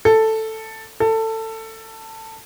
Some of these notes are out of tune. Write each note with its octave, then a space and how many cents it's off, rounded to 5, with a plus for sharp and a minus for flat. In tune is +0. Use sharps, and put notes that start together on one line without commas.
A4 +5
A4 +20